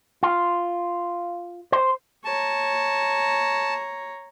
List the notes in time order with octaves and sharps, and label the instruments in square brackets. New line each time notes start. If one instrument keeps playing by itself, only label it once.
[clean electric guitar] F4
C5
[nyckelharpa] C#5 A#5 [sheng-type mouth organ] A5